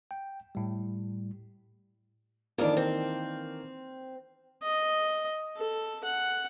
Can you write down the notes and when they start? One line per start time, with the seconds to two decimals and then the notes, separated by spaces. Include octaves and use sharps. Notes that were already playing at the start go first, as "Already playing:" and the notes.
0.11 G5
0.55 A2 G3
2.58 F2 D#3 E3 A#3 D4
2.77 C4
4.63 D#5
5.57 A4
6.04 F#5